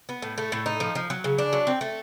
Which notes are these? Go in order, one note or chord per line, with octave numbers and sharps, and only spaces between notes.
B3
A2
A3
A2
D#4
F3
F3
F#3
C#3
D4
F#3
C4
A3